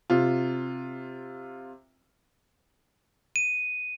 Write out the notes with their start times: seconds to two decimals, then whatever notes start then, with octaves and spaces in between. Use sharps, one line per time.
0.10 C3 F4
3.36 D#7